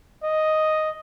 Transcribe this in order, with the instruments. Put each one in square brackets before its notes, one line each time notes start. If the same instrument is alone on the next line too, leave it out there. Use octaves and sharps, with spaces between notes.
[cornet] D#5